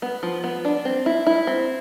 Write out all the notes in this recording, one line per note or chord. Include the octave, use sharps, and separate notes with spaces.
B3
F3
B3
D4
C4
E4
E4
C4